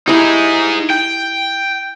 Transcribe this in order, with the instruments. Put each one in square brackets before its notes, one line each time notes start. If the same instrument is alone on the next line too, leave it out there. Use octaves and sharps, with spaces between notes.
[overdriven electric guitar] D#4 G#4 [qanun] E4 G4
[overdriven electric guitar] G5